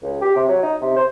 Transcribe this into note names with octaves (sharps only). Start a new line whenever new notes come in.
C#2
G4
C3
F#3
D#4
C3
C5